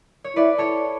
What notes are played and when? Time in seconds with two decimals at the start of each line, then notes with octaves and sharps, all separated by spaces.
0.24 C#5
0.36 E4 B4 D5
0.58 A4 C#5